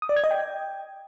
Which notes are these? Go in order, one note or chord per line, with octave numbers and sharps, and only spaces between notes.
D#6
D5
G#6
D#5
G5